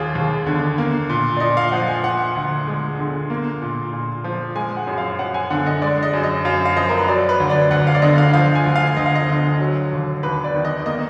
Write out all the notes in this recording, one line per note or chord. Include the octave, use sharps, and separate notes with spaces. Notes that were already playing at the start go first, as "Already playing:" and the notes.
Already playing: D#2 F4 G#4
D#2
D3
A#3
A#2
D5
A#2 D#5
F5
F3 F#5
G#5
F3 F#5
D2
G#3
D3
A#3
A#2
A#2
F3
G#3 G#5
F#5
F#2
F5
F#2 F#5
G#5
D3 F#5
D#5
G#3 D5
D5
D#5
F#2
D#5
F#2 F5
F5
F3 D#5
A#4
B4
F#3 D5
B4
D2
D5
D2 F#5
F5
D5
D3 D#5
F5
F3 F5
G#5
D2
F5
D2 D#5
F5
D#5
D3
F#3
D#2
D#2 B4
D5
D#3
D#5
A#3 D#5